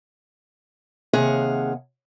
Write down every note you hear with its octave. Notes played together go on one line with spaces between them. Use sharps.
D#2 C3 G#4 F5 F#5